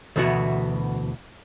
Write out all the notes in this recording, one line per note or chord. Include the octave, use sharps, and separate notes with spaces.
D2 B2 E3 B3 E4 F#4